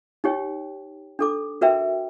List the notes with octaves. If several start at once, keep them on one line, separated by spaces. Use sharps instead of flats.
D#4 G4 C#5 G5
D4 A4 D6
F#4 A#4 B4 E5 G5